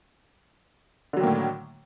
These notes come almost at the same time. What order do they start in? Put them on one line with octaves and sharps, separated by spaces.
D3 F#3 D#3 A#3 A2